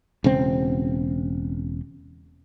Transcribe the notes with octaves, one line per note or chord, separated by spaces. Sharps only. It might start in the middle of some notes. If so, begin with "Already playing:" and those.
E1 C#3 C4